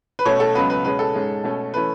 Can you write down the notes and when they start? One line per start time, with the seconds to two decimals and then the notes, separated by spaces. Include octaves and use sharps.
0.19 B4
0.25 B2 A3 C#4 C#5
0.40 A4
0.55 C#2 C#3 F#3 B3 B4
0.70 B4
0.85 B2 G#3 C#4 B4
0.99 A4
1.15 G#2 G#3 C#4
1.44 B2 A3 C#4
1.74 E3 A3 C#4 B4